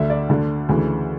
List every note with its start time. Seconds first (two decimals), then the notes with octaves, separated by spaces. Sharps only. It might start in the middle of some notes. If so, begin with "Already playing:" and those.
Already playing: D2 D3 E5
0.10 D5
0.29 D2 D3
0.69 D2 C#3 E3